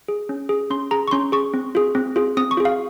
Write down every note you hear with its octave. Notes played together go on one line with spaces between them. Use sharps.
G#4
C#4
G#4
C#4 C6
G#4 A#5
C#6
C#4 C6
G#4 C#6
C4
F4 G#4
C4
F4 G#4
C4 D#6
C#6
F4 G#4
F5